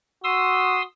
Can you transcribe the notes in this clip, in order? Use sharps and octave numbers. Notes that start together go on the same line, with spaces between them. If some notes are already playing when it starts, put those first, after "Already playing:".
F#4 C6 D#6 E6